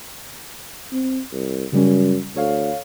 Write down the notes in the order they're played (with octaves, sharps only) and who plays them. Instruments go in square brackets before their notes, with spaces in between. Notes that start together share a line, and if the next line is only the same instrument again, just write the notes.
[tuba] C4
C2
[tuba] F#2 [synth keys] C#3 G3 C#4
[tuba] D2 [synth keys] A4 C#5 F5